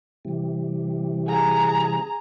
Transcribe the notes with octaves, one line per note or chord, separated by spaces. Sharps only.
C3 E3 G3
G#4 A#5